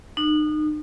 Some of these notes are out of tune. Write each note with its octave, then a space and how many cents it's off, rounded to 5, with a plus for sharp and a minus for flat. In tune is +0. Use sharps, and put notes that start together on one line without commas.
D#4 -35